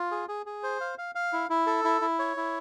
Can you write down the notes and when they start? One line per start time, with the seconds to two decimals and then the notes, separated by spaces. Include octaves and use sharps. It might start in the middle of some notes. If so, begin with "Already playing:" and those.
Already playing: F4
0.11 G#4
0.28 G#4
0.46 G#4
0.63 C5
0.81 F5
0.98 F5
1.15 F5
1.33 E4
1.50 E4
1.67 A4
1.85 E4
2.01 E4
2.19 C#5
2.37 E4